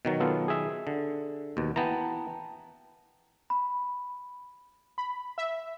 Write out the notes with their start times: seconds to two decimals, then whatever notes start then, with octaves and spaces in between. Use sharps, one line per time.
0.05 B2 D#3 F#3
0.20 B3 F4 A4
0.48 G#4 E5
0.87 D3
1.57 D#2 B2
1.76 E3 B3 G5 A5 A#5
3.50 B5
4.98 B5
5.38 E5